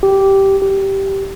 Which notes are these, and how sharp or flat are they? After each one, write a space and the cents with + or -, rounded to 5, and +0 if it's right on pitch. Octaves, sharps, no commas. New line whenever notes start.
G4 -10
G4 -10